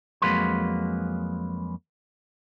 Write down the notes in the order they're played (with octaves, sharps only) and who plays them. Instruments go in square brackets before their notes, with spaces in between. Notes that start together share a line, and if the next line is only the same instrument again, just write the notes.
[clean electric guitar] F2 F#3 G#3 A#3 B4 C6